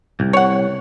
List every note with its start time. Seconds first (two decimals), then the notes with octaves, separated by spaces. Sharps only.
0.20 C2
0.33 C#5 F#5